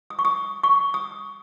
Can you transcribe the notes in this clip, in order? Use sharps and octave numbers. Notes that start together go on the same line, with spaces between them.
D#6
C#6
D#6
C#6
D#6